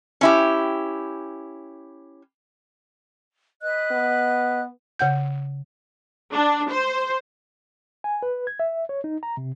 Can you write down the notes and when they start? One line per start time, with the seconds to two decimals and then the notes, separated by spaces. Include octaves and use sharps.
0.21 C#4 E4 G4
3.62 B4 D#5 F#6
3.91 B3
4.99 C#3 F#5 G6
6.33 D4
6.70 C5
8.04 G#5
8.22 B4
8.47 G#6
8.59 E5
8.89 C#5
9.04 D#4
9.23 A#5
9.37 C3